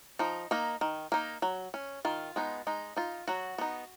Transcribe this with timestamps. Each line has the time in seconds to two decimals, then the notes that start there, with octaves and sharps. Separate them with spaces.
0.19 F3 D#4
0.51 A#3 D#4
0.81 D#3
1.12 A#3 D#4
1.42 F#3
1.74 C#4
2.05 D#3 F4
2.36 G#3 B3 D#4
2.67 G#3 D#4
2.97 D#4 F4
3.28 F#3 F#4
3.58 B3 D#4